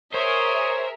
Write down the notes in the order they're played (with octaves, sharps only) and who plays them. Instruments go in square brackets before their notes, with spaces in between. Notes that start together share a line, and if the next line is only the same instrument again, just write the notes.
[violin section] G#4 A#4 E5 [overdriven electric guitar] C5 [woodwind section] C#5 [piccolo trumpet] D#6